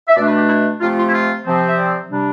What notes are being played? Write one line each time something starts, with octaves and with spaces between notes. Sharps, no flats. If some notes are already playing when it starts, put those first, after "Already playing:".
E5
B2 A3 D4 D5
B4
G4
E4
C3 F3 A3 C4 F4
F4
E4
F4
C3 F3 C4
E5
D5
C3 G3 D4